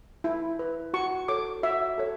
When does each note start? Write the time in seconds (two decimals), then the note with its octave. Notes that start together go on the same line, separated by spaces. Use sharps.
0.24 E4
0.59 B4
0.94 F#4 C#6
1.28 A4 C#5 D6
1.63 F#4 E5
1.98 A4 C#5